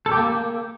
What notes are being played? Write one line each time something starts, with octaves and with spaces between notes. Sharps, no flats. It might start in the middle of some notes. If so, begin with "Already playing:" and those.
A4
G4
A#3